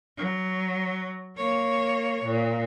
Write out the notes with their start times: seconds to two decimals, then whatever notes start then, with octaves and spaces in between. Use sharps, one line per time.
0.17 F#3
1.37 A#3 C#5
2.24 A#2